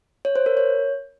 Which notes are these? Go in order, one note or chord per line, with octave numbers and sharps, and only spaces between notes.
C#5
C5
A#4
C#5